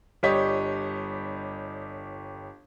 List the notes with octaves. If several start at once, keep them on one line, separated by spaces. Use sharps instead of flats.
G1 G3 G4 C#5 D#5 B6